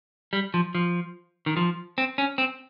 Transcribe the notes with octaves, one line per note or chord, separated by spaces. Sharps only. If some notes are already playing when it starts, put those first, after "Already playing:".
G3
F3
F3
D#3
F3
C4
C#4
C4